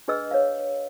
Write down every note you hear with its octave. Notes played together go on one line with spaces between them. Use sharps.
D4 G#4 B4 D#5 E6
C#5 F5